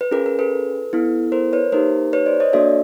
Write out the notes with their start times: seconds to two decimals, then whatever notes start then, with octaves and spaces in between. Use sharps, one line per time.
0.01 B4
0.11 C#4 F4 G#4 A#4
0.26 A#4
0.39 A4 B4
0.93 B3 E4 A4
1.32 A#4 C5
1.53 B4 C#5
1.72 A#3 D#4 G4 A#4 C5
2.13 B4 C#5
2.26 C5 D5
2.40 C#5 D#5
2.53 A#3 D4 F#4 A4 D5 E5